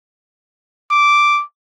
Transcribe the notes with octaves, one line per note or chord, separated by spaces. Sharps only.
D6